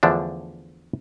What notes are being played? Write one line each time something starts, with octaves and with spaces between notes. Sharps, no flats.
E2 D3 F3 A3 D4